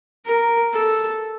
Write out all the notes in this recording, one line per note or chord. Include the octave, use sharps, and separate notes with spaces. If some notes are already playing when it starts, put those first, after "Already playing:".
A#4
A4